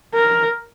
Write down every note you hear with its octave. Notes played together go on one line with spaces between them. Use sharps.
A#4